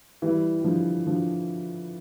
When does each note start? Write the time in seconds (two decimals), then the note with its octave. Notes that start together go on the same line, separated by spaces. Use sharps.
0.22 E3 G3
0.60 G3
0.64 D3 F3
1.06 D3 F3